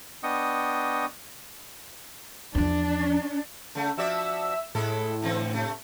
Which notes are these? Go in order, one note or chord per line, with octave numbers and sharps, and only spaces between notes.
B3 D4 D#5 G5 C#6 D#6
E2 F3 D4
C#3 A3
F3 F#4 D5 E5 E6
A2 G#3 E4 A4
D3 E3 C4
C3 A3